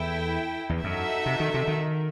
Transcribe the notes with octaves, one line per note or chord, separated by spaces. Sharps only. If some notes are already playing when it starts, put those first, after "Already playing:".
Already playing: E2 E4 A4 E5 G5
E2
F#2 D#4 F#4 A4 E5
C3
D#3
C3
D#3